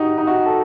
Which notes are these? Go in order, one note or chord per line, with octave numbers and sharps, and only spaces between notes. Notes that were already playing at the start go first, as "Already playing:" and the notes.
Already playing: D#4 F#4 G4
D#4
F#4
A4